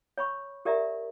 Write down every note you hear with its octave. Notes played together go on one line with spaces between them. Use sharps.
C#5 B5 C#6
G4 A#4 D5 E5 A#5